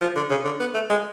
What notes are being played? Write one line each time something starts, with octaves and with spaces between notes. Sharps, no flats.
F3
D3
C#3
D3
B3
A3
G#3